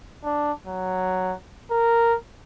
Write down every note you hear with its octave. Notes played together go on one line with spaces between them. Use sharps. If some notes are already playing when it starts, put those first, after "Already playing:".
D4
F#3
A#4